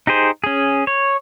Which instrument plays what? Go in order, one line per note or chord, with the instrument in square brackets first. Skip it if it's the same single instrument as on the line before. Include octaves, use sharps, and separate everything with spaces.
[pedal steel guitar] D#4 G4 G#4 C5
C#4 G#4
C#5